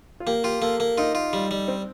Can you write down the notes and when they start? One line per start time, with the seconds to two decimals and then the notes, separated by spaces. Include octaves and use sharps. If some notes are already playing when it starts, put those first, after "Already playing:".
0.20 F4
0.26 A#3 G4
0.44 F4 G4
0.62 A#3 A4
0.80 A#3
0.98 D#4 F4
1.15 F4
1.33 G3
1.51 G3
1.68 C4